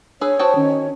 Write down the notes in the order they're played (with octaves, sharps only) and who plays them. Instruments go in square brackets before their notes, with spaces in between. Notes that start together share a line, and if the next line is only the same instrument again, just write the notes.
[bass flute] D4 [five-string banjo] G#4 B4 [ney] C#5 [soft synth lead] E6
[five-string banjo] F#4 G5 A5 [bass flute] C5 [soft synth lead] D#6
[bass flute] D#3 [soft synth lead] C#4